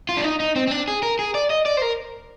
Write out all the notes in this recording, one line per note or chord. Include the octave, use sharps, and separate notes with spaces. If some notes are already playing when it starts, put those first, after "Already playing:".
F4
D4
D#4
D#4
C4
C4
D4
G#4
A#4
G#4
D5
D#5
D5
C5
A#4